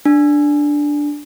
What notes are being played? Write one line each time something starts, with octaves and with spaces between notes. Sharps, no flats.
D4